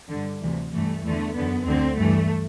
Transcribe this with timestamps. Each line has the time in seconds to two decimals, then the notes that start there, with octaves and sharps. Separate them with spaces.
0.09 G2 D3
0.40 D2 C3 E3
0.72 G2 E3 A3
1.03 E2 D3 A3
1.35 F#2 D3 B3
1.66 D2 D3 C4
1.98 G2 E3 A3